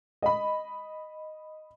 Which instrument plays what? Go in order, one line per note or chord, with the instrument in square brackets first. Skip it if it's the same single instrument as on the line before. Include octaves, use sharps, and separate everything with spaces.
[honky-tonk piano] D#5 B5